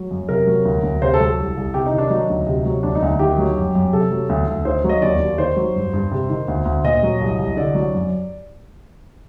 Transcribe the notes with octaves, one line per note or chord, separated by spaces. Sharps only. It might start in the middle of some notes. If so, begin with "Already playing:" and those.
Already playing: F#3
F#2
C3 A#4
F#3
D2
D2
C3 C5
A4
F#3
A4
C2
C2
C3 G4
D#4
D#3
D4
F#3 D#4
D2
C3
F#3
D2 D4
D#4
D2
D#4
D#3 G4
F#3
F#2
F#2
C3 A4
F#3
D2
D2
D#3 C5
F#3
D#5
D#2 D5
D#2
D#3 C5
F#3
G2
G2
C3
D#3
D2
D2
A#2 D#5
F#3
C2
C2
D3 D5
F#3
F#2